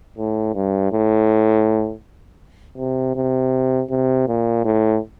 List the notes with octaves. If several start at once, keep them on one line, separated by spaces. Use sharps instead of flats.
A2
G2
A2
C3
C3
C3
A#2
A2